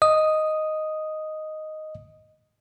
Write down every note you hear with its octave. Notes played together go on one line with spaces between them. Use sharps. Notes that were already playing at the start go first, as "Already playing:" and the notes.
D#5 D#6